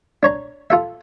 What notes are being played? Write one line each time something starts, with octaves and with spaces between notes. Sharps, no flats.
D4 C#5 A#5
F4 A4 E5